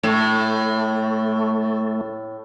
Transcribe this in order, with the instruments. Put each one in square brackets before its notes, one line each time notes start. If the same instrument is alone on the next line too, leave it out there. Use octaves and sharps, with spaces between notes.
[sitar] A2 [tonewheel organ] A3